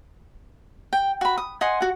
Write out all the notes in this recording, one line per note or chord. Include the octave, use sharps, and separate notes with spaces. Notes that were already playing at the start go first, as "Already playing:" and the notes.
G5
F#4 B5
D#6
D#5 F#5 G#5 C6
F#4 F#5